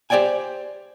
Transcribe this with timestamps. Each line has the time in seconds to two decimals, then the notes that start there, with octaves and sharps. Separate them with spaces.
0.10 G4 C5 D5 G5 G#5